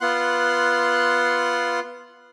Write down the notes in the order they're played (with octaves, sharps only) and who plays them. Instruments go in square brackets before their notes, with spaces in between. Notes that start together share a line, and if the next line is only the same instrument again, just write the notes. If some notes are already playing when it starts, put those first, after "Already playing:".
[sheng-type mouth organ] B3 F4 F#5 C6 F#6